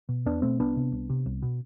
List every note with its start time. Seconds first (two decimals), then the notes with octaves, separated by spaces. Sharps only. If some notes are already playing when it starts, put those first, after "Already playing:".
0.09 B2
0.26 E2 B3 D4
0.42 B2 A3 C4
0.59 C2 B3 D4
0.77 C3
0.92 C2
1.10 C3
1.26 C2
1.42 B2